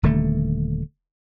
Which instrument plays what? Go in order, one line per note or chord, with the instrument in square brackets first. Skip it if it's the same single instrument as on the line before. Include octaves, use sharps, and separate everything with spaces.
[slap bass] D#1 D3 A3